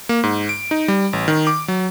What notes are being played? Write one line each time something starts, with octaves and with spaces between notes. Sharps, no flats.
A#3
G#2
D7
D#4
G3
A1
D#3
D6
F#3